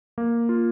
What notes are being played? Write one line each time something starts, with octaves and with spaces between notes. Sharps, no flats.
A#3
F4